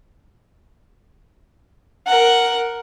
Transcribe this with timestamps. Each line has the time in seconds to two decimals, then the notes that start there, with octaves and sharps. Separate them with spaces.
2.07 A#4 F#5